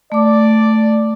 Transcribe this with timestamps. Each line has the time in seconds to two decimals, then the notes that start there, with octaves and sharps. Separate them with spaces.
0.12 A3 D5 D6